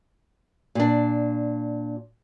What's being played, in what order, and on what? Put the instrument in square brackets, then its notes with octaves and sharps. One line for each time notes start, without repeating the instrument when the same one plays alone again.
[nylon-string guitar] A#2 D4